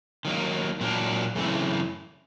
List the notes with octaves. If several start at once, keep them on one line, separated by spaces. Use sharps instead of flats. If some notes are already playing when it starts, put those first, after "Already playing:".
D#3 F#3 A#3
A#2 F#3 A#3 D4
F#2 C#3 E3 A3 C4